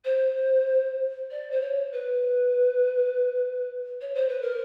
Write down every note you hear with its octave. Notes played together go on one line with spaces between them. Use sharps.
C5
D5
C5
C#5
B4
C#5
C5
B4
A#4